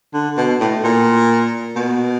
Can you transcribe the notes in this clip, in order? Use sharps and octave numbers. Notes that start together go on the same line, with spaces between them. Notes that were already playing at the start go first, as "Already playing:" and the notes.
D3
B2
A2
A#2
B2